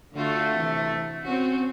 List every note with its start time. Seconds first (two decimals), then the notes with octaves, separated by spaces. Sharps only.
0.14 D3 A3 F4 F#4
0.52 C3 E3
1.24 C4 C#4 F#4